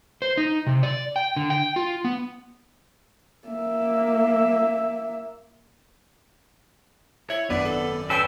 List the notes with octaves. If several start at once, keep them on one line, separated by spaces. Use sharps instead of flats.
C5
D#4
C3
D5
G5
D3
G5
F4
B3
A#3 E5
E4 C#5
G#1 F#2 B3 D4 D5
A4
C#4 A4 B4 G5